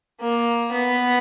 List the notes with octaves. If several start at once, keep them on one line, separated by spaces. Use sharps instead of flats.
A#3
B3